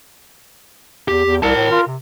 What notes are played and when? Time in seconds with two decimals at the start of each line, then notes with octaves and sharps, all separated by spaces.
1.08 E2 G4
1.26 E2
1.43 C2 A#4 A5
1.56 A2
1.71 F4
1.87 C3